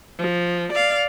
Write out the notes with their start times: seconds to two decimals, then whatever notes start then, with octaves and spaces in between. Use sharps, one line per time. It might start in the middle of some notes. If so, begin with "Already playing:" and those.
0.19 F3
0.73 D5 F5